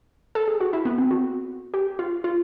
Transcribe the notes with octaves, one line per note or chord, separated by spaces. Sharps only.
A4
G#4
F#4
E4
B3
C4
F#4
G4
F4
F4